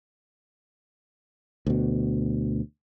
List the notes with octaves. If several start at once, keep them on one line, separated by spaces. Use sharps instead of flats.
D2 B2